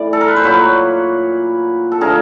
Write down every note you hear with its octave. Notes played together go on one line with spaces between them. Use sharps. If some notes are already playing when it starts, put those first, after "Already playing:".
Already playing: A2 E3 D5
A4
A#4
B4
C5
A#2 F#3 A#3 B4 C#5
A4
D3 F3 A3 G#4 A#4